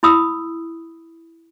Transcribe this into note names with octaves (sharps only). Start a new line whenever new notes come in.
E4 B5 D#6 E6